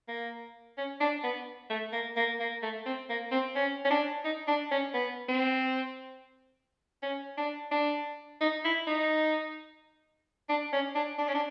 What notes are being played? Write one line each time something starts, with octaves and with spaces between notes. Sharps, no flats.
A#3
C#4
D4
B3
A3
A#3
A#3
A#3
A3
C4
A#3
C4
C#4
C#4
D4
D#4
D4
C#4
B3
C4
C#4
D4
D4
D#4
E4
D#4
D4
C#4
D4
D4
C#4
D4